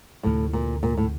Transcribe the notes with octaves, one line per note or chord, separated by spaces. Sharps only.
D2 A2 C3 F3
A#2
A#2
A2